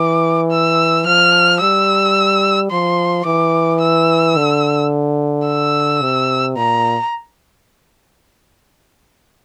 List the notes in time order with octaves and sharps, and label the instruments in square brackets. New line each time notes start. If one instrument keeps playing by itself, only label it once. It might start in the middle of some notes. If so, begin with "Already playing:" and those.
Already playing: [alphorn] E3 [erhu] D6
[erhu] E6
[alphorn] F3 [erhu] F6
[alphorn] G3 [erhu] E6
[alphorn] F3 [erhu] C6
[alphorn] E3 [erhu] D6
[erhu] E6
[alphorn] D3
[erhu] E6
[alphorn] C3
[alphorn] A#2 [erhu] A#5